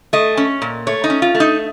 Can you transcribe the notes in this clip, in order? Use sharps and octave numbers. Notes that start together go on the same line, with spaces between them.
A3 D#5
C#4
A#2
A3 C#5
D#4
C#4
F4
A3
D#4